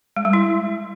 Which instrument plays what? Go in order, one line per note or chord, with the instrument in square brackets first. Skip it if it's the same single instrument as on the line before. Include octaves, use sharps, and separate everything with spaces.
[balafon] G#3
G3
E4